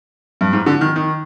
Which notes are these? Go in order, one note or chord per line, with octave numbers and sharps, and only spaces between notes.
G2
G#2
D3
D#3
D#3